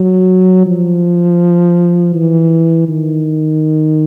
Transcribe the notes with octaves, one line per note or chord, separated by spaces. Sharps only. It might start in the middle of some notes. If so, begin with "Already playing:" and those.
Already playing: F#3
F3
E3
D#3